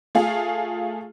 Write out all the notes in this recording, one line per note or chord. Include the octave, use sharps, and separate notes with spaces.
A3 F4 G#4 F5